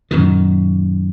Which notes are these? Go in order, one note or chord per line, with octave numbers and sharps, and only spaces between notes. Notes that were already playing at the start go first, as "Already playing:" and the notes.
F#2 A#2 D#3